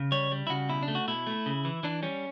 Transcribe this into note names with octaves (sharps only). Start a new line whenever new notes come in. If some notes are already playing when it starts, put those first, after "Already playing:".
Already playing: C#3
G3 C#5
G3
E4
C#3 F#4
B2 E4
D4
A3
F#4
B2 E4
A3
C#3
E3
E3 D4
G3 C#4